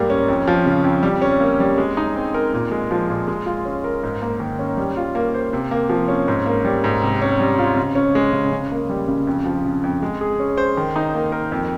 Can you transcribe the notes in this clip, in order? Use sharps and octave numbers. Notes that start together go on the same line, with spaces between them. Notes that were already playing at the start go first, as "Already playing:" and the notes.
Already playing: G#2 G3 A#3
C#4
F2
F3
C#3
F2
G3
C#4
A#3
G3
G#3
D#4
C4
A#4
A#2
G#3
F3
A#2
G#3
F4
C#4
A#4
G#2
A#3
D#3
C#4
G3
F4
A#3
C5
C3
A#3
F3
C#4
G#2
A#3
G3
G#2
C3
C#4
G3
F4
C#3
C#4
G#3
C#3
C#3
A#3
G3
C#3
F2
F3
C#3
F2
G#3
G#4
C#4
C5
D#3
D#4
A#3
A#4
F2